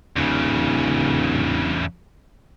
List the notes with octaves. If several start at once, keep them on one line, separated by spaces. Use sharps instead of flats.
D1 E2 C#3